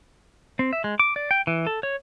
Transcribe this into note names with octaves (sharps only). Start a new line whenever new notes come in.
C4
E5
G#3
D6
D5
G5
E3
A4
C#5